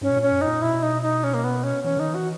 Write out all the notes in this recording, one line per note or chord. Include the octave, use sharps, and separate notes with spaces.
G#2 C#4
B2
A#2
C#4
F#2
D#4
A#2
B2 E4
D#4
D#4
C#4
A#3
B3
C#4
E3 C#4
D#3 D#4
E3 F#4